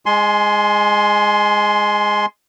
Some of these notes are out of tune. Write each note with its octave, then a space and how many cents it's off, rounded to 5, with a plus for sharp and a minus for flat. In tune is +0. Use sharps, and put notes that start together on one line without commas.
G#3 -10 G#5 +25 C6 +0